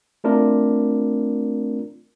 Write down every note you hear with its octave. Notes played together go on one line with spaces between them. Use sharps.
A3 C4 D4 F4 A#4